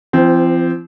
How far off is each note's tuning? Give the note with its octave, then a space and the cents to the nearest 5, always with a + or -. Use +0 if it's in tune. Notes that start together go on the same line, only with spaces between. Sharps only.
F3 -40 C4 -10